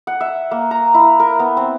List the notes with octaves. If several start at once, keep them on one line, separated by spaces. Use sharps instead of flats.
F#5
E5
A#3
A#5
E4
A#4
B3
C4